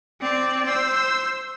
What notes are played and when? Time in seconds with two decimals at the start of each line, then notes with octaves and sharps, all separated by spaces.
0.21 C4 D5
0.66 C5 E6